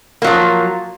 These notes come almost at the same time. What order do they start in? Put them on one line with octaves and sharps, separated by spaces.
A#3 F#3 F3